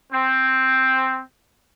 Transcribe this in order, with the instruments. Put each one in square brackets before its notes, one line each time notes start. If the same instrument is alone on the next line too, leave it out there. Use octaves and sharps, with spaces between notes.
[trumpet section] C4